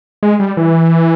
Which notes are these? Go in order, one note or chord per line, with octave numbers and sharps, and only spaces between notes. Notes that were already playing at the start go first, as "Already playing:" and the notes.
G#3
G3
E3